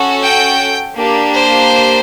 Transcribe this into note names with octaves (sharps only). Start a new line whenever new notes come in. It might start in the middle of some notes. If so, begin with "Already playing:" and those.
Already playing: C#4 F#4 A4
G5
A#3 D4 G4
C5